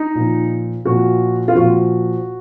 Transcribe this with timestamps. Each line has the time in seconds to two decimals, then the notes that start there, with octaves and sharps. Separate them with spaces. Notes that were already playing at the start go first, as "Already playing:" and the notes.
Already playing: D#4
0.15 A#2 F3
0.85 A#2 F3 F#4
1.48 F4
1.55 A#2 F3 F#4